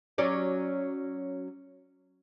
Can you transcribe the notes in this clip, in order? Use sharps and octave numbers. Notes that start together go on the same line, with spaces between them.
F#3 C#4 D5